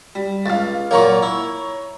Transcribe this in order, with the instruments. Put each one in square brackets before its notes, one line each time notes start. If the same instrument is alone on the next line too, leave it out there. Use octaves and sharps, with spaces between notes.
[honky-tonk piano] G3
[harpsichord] C#2 [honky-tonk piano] F5 A6
[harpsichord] A#2 F#3 A#3 [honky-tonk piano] C#5 A#5 C#6
[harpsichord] E4